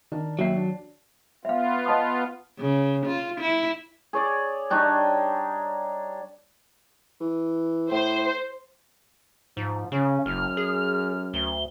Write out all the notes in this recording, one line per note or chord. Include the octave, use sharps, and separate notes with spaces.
D#3 D4 A#4
D#2 F#3 E5 C7
D4
B3 F4 E5 F5
D#5 A5 D#6
C#3
F4
E4
G#4 C#5 D5
G3 D4 D#4 C#5
E3
A2 C5
G#2 F3
C#3 C#4
F#1 F#2 F6
G#4
D2 G7